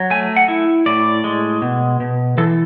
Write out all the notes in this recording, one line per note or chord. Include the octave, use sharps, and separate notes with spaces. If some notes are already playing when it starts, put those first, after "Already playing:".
Already playing: F#3
A3 G#5
F#5
E4
A2 D5
G#3
B2
B2
E3 A4